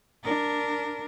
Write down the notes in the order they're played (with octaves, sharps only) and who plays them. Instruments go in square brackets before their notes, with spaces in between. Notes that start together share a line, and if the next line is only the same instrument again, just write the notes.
[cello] D4 A#4